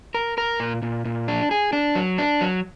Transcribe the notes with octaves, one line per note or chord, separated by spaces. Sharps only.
A#4
A#4
A#2
A#2
A#2
D4
G#4
D4
F#3
D4
F#3